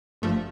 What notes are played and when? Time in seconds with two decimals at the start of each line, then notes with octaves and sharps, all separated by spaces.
0.22 G1 G2 F3 A3